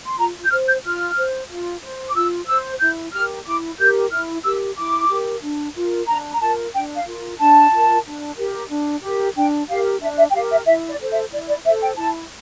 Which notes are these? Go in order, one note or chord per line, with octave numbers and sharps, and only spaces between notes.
C6
F4 A#5
G6
C5 F6
G6
F4 F6
C5
F4
C5
D6
F4 E6
C5 E6
E4 G6
G4 A#4 F6
E4 D6
G4 A#4 G6
E4 F6
G4 A#4 E6
E4 D6
G4 A#4
D4
F4 A#4
D4 A#5
A#5
F4 A#4 A5
D4 G5
F5
F4 A#4
D4 A5
F4 A#4
D4
G4 A#4
D4
G4 A#4
D4 G5
G4 A#4 F5
D4 E5
E5
G5
G4 A#4 F5
E5
E4 E5
D5
A4 C5
E5
E4 D5
D5
A4 C5 E5
G5
E4 A5